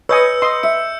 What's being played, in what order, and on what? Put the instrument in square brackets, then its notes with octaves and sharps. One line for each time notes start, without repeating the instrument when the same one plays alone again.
[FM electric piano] B4 [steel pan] C#5 D#5 G#5 [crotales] E6 G6 C#7
[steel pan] D#5 C6
[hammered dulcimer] E5 [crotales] C#7